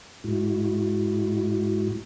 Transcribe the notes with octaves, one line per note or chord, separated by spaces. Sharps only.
G#2 G#3 E4 F#4